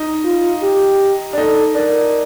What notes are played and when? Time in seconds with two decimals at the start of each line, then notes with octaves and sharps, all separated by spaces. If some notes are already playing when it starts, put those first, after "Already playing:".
Already playing: D#4
0.24 F4
0.63 G4
1.33 D4
1.37 D#4 A4
1.75 D4 A#4